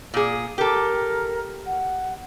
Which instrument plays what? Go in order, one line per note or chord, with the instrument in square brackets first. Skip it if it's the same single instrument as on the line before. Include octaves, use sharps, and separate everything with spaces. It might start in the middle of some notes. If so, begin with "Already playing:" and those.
[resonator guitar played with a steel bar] A#2 G#4
[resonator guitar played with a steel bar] G4 A4 [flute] A#4
[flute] F#5